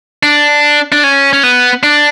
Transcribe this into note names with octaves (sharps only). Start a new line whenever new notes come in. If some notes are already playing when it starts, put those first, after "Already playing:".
D4
D4
C#4
C#4
B3
D4